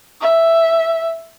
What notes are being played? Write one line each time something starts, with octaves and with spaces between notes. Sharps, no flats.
E5